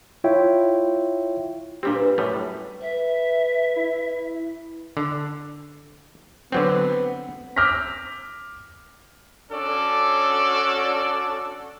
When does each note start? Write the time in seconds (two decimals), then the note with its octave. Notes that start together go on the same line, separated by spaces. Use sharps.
0.24 E4 F4 C#5 E5 G5
1.83 A#2 G3 C4 D4 G4
1.96 B4
2.18 F#2 A2 G3
2.82 B4 E5
3.76 E4
4.97 D3
6.52 D3 F#3 B3 C4
7.56 D6 E6 F6 G6 A#6 B6
9.51 C#4 D4 F#4 A4 D5